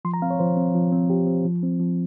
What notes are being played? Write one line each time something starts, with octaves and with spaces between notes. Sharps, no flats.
F3 C6
A#5
C4 F5
C#5
F3 C5
C4
F3
C4
F3 G4
C4
F3
C4
F3